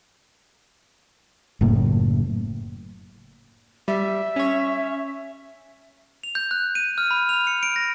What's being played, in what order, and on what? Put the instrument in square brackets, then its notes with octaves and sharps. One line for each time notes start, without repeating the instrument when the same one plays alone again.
[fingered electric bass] F#1 A2 A#3
[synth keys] G3 [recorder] E5
[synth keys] C#4 C#5
[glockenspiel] F7
G6
F#6
D#7
F6
B5
F7
C#7
D7
A#6